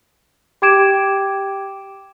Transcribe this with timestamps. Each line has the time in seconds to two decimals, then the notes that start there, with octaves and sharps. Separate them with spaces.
0.62 G4 G5 D6 G#6 D7 E7